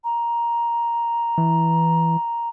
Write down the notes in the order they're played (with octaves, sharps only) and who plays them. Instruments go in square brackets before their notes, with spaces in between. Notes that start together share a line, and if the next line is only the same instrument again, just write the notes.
[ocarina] A#5
[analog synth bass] E3